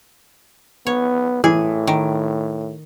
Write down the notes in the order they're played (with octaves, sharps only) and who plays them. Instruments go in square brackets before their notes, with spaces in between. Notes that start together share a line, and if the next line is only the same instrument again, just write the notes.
[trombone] B3 [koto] C#5
[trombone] A2 [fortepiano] E3 [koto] G#4
[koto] D#3